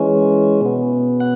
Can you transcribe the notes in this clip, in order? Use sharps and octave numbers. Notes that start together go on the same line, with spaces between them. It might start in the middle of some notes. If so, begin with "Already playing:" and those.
Already playing: E3 G#3 C#4
B2 B3
F#5